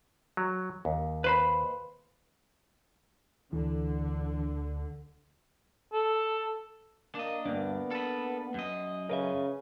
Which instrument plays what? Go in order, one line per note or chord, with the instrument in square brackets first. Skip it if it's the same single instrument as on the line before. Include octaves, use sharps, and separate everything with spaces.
[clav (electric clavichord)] F#3
D#2
[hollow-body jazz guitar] B4 C5 B5
[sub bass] D2 [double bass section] D3 [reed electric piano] E3
[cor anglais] A4
[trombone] A#3 [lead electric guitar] D4 D#5
[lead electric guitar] D2 G2 [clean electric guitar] A#3 D4 [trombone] B3
[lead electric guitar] A4 B4
F#2 D#5
[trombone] C#3 [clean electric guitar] A#4 B4 E5